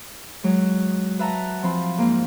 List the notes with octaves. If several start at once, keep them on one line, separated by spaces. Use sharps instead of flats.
F#3 G#3
B4 E5 F#5 A5 A#5
F3 C4 B5
G#2 A#3